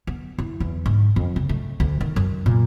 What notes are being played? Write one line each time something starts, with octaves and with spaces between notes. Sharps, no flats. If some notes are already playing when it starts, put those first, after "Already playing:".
B3
E4
E2
G#2
F2
C#3
A3
D2
D#3
F#2
A#2